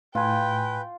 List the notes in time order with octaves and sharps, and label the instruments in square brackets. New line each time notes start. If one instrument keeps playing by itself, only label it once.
[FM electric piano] A2 G#5 [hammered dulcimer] F4 [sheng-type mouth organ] B4 [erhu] G5